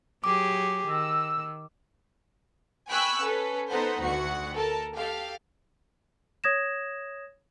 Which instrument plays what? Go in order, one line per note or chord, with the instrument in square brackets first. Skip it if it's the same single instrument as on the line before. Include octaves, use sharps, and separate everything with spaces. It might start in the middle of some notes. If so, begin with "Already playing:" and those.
[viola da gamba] F#3 G4 G#4 [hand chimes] D6
[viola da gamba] D#3 [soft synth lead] E6
[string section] G5 G#5 B5 C#6 E6 F#6
C#4 A4 B4
B3 D#4 A4 B4 C5 F#5
D2 F#4 F#5 C#7
A4 A#4 A5
G4 A4 F5
[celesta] C#5 D#6 G#6 A#6 E7